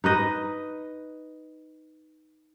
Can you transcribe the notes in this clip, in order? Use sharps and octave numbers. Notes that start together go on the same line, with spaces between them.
D#4 B4 D#5